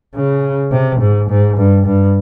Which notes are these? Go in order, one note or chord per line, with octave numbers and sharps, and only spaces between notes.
C#3
C3
G#2
G#2
G2
G2